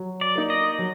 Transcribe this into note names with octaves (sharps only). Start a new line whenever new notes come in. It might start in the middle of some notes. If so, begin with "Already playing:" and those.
Already playing: F#3
D5
A#3 D#4
D#5
F#3